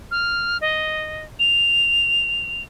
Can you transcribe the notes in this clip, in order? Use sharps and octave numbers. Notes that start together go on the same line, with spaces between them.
F6
D#5
F7